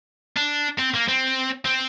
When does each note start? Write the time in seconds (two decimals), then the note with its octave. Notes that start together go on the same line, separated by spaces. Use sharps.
0.36 D4
0.78 C4
0.94 A#3
1.08 C4
1.65 C4